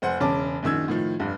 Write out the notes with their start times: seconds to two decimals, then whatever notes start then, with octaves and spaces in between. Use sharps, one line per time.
0.02 F1 C5 F#5 G#5
0.20 E1 C#3 C#4 A5 D6
0.63 A#1 F#2 D#3 E6 G#6
0.88 A2 D#3 F3
1.19 F1 G2